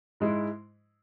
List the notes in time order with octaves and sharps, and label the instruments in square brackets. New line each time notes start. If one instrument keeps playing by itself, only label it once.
[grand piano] G#2 G#3 E4